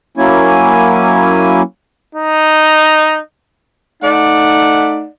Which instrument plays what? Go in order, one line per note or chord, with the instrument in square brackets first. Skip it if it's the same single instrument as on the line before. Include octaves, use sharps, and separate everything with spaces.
[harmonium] F#3 A#3 C#4 E4 G#5
[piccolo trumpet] D#4
[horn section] A3 D#4 D5 F#5